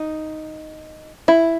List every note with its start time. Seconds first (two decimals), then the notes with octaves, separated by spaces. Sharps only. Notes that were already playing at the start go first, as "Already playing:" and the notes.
Already playing: D#4
1.28 E4